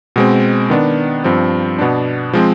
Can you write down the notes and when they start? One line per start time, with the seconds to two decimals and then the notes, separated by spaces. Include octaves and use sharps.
0.16 B2 G#3 C4
0.70 D#3 B3 D4
1.24 G2 F3 C4
1.79 B2 B3 D4
2.33 F3 G#3 C4